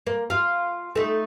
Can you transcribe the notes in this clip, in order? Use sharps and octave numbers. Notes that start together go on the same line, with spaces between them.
A#3
F4 F5
A3 D#4